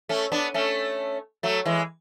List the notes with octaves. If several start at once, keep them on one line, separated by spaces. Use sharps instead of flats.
A3 C#4
B3 D4
A3 C#4
F#3 A3
E3 G#3